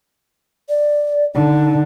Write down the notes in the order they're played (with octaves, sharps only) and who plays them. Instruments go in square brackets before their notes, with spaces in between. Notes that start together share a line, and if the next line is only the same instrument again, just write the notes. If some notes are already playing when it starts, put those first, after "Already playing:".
[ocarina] D5
[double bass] D3 [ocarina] D#4